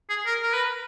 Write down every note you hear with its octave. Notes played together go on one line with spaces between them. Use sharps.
G#4
A#4
A#4
B4